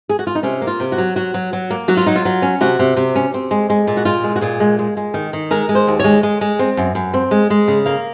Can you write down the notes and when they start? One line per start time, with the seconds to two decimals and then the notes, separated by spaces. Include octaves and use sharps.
0.09 G#4
0.19 F#4
0.27 F4
0.35 D#4
0.43 C3 C#4
0.62 A#3
0.67 F4
0.80 C3
0.92 F#4
0.98 F#3
1.16 F#3 F#4
1.34 F#3
1.53 F#3
1.70 A#3
1.88 F#3 F#4
1.97 F4
2.06 F#3 D#4
2.16 F4
2.25 F#3
2.42 C#4
2.61 C3 F#4
2.79 C3
2.97 C3
3.15 C#4
3.34 C4
3.51 G#3
3.70 G#3
3.87 A#2
3.97 F#4
4.05 A#2 F4
4.24 G#3
4.36 F#4
4.41 A#2 G#4
4.60 G#3
4.79 G#3
4.97 G#3
5.14 D#3
5.33 D#3
5.51 G#3 A#4
5.69 G#3
5.75 C5
5.87 D#2
5.99 G#3 C#5
6.23 G#3
6.41 G#3
6.59 C4
6.77 F#2
6.95 F#2
7.14 C4
7.31 G#3
7.50 G#3
7.68 C#3
7.85 A#3 F5